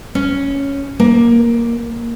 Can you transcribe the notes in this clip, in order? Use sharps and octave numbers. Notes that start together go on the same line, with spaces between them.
C#4
A#3